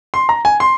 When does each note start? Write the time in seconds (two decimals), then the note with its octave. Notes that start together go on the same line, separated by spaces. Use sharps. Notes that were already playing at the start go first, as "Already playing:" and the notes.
0.14 C6
0.29 A#5
0.45 G#5
0.60 C6